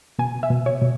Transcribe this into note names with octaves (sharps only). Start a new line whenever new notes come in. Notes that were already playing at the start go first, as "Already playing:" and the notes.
B2 G#5
E5
B2
C#5
B2